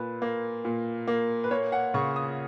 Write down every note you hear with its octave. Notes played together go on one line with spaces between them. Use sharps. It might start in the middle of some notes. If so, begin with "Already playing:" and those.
Already playing: A#2 B4
A#3
A#2
A#3
B4
A#3 C#5
F#5
C#3 C#6
D#6